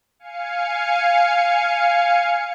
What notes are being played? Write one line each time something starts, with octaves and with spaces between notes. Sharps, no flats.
F5 G#5 C#7